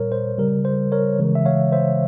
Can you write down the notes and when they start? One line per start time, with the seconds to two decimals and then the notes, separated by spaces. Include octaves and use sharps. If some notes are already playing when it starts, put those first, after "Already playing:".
Already playing: A#2 G3 A#4 C#5
0.12 C5
0.38 C#3 G3 A#4
0.65 C5
0.92 A#4 C#5
1.19 C#3 E3 G#3
1.35 E5
1.46 C#5 F5
1.72 C5 E5